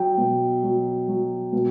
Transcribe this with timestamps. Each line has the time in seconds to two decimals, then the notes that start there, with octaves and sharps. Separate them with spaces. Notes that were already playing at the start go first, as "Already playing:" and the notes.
Already playing: F#3 G5
0.18 B2
0.63 F#3
1.08 F#3
1.53 B2